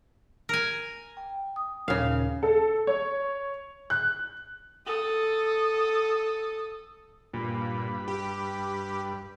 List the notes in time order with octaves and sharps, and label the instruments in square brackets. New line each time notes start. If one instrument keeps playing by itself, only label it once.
[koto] A#4 G#5
[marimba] G5
D#6
[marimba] D#2 A#2 [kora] C#3 F5
[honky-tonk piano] A4
C#5
F#6
[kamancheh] A4 D#6
[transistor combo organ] G2 B4 [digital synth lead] A#2
[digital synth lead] G4